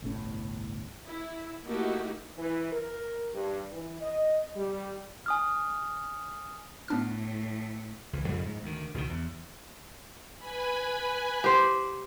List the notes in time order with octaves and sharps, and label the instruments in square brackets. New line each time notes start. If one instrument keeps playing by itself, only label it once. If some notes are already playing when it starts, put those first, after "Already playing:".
[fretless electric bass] G1 C2 A2 C#4
[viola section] E4
A3 A#3 D#4 E4 F#4 G4
[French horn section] E3
A#4
G2
E3
D#5
G3
[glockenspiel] G#5 D#6 F6
[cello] A2 [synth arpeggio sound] B3 D4 F6
[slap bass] C#2 E3
F2 G#2 C#3 G3
G#2
D2 D#3
C#2 B2 D3 D#3
E2
[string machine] B4 G#5 B5
[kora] G4 C5